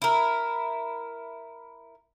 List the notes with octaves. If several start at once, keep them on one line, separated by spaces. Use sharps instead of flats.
E4 A#4